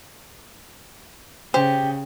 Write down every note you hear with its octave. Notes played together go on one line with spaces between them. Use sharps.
C#3 G4 C5